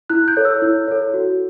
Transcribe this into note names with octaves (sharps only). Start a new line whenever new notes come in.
E4 F#6
G6
A4 C#5
E6
E4
A4 C#5
F#4